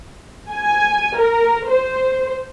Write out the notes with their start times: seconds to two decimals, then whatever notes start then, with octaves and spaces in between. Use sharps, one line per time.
0.50 G#5
1.17 A#4
1.67 C5